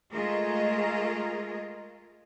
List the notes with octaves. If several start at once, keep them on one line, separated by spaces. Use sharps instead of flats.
G#3 A3 F4 G#4 A#4 D#5